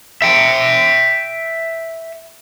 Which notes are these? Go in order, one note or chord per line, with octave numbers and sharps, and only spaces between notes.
E5 G5